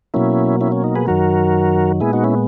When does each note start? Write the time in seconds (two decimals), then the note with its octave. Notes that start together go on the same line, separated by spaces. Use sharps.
0.14 B2 F#3 A#3 C#4 E4
0.61 C#4 E4
0.72 C#4
0.84 D#4
0.95 G#4 B4
1.07 F#2 D#3 F#3 F#4 A#4
2.00 A#2 G#3 B3 E4 G#4
2.13 D#4 F#4
2.24 C#4 E4